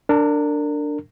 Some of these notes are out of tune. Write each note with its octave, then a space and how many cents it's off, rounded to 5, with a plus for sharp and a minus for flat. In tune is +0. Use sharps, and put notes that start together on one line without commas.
D4 +0 A#4 -30